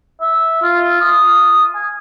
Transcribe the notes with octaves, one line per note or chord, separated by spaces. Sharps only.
E5
F4
D#6
G#5